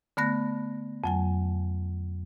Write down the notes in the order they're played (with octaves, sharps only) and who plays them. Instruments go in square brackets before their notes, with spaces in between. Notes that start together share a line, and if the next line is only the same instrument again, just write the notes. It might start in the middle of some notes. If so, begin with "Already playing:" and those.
[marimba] D3 A3 B3 F#6 A#6
F2 F#3 G#5